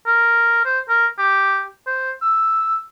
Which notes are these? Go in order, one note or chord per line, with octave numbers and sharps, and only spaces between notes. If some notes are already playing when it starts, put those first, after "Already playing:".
A#4
C5
A#4
G4
C5
E6